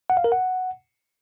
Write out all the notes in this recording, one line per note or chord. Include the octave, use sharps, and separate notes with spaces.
F#5
F5
A#4
F#5